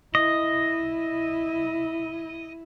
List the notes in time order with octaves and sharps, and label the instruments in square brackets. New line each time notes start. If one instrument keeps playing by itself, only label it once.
[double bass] E4 [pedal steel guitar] D#5